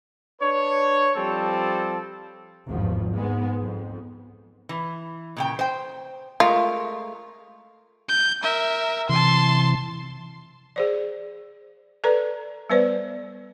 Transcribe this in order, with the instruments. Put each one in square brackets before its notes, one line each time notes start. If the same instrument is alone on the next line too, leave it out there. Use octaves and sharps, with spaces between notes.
[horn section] D4 B4 C#5
F3 G3 C4 A4 A5
[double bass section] G#1 E2 G2 F3
G#2 G#3 B3
F2
[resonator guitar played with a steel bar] E3
A#2 C#3 G5
C5 G5
[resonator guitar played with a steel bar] G#3 A3 A#4 [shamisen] F4
[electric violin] G6
A#4 E5
[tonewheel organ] C3 E3 [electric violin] A5 C6
[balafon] G#4 C5 D5
A4 B4 D5 A#5
G3 B3 B4 C5 D5